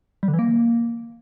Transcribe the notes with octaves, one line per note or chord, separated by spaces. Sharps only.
G3
D3
E3
A#3